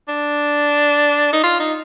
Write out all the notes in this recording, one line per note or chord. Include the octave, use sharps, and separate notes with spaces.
D4
D#4
F4
D#4